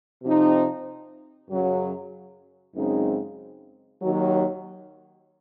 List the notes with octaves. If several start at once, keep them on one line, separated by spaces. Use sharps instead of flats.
C3 F3 C4 D#4
F#2 C#3 F#3
F#2 C#3 G#3 C4 D#4
D#2 D#3 F#3